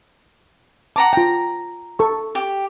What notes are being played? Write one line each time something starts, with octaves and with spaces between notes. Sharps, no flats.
F#5 A5 A#5 D6
F4 G5 A#5
A4 C#6
G4